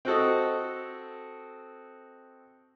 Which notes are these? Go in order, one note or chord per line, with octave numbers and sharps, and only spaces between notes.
C4 F#4 A4 D#5